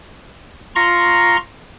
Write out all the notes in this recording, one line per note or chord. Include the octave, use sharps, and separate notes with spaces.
F4 A#5 C6 C#6 A#6